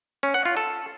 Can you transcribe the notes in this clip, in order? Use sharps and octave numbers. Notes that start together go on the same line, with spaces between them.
C#4
F#5
F4
A4